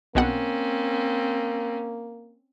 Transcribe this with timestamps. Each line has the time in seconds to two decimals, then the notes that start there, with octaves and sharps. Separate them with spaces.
0.15 B1 B2 A#3 C4 C#4 F#5